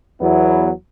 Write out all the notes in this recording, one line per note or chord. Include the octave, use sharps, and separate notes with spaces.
E2 F#3 B3 E4